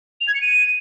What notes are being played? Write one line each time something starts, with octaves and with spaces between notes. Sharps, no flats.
F7
G#6
C#7
D#7